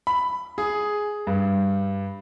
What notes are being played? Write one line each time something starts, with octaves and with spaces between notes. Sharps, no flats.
B5
G#4
G2